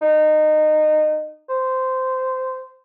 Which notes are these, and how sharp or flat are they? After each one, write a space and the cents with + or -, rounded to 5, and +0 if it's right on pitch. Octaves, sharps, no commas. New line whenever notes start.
D#4 -20
C5 -15